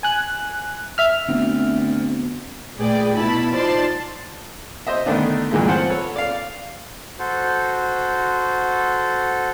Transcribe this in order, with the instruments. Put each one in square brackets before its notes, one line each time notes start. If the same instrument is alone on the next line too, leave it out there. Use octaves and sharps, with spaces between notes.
[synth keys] G#5 F#6
E5 F6
[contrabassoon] D2 [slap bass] B3 C4
[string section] A#2 A3 G#4 B4 D5 G5
B2 E4 A5 B5
D#4 F4 C5 D5 A5 C6
[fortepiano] C5 D#5 E5
D3 D#3 A3 B3 D4
G2 A#2 D3 E3 G#3 A3
C4 F4 C5 F#5 A5
A4 B4 C#5
D5 F5
[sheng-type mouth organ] F#4 A4 C5